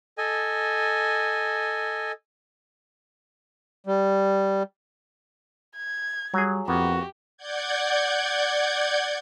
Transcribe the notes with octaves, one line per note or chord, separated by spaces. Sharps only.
A4 D#5 G#5
G3
G#6
F#3 G3 G#4
F2 A#3 B3 F#4 G4
D5 F#5 G6 G#6